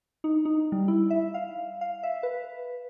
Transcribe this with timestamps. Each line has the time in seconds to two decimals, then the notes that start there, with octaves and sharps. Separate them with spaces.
0.24 D#4
0.45 D#4
0.72 G3
0.88 E4
1.10 E5
1.34 F5
1.81 F5
2.03 E5
2.23 B4